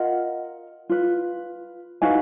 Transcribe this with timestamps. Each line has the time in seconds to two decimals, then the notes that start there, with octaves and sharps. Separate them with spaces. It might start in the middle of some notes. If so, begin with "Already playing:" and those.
Already playing: F4 A#4 D#5 F#5
0.89 F4 B4
2.02 D#4 F#4 B4 F5 G#5